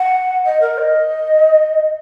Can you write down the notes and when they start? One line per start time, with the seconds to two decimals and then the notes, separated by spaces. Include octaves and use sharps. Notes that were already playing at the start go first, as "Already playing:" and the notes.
Already playing: F#5
0.44 D#5
0.60 A#4
0.77 D#5